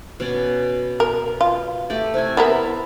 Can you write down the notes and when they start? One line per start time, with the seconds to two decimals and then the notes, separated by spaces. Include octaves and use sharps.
0.20 B2 C#4 D5
1.00 A#4
1.41 F4
1.90 A3 G4 D5
2.14 C3 E4 G#5
2.37 B3 E4 A#4 A5 B5 C6